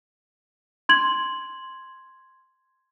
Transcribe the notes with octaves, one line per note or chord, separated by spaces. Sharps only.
C6 G#6 F#7